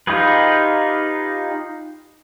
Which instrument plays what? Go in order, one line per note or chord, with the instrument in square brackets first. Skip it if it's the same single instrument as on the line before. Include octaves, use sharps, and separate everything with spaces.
[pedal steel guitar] D#4 F4 G4 G#4 B4